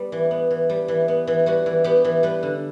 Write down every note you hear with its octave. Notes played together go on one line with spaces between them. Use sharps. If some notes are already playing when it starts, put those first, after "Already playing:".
Already playing: G3 B3
E3
B3
E3
G3
E3
B3
E3
G3 F#4
E3
B3 G4
E3
G3 B4
D3